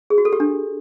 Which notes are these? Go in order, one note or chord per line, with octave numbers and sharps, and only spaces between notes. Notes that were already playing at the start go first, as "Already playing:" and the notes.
G#4
F#4
A4
G4
D4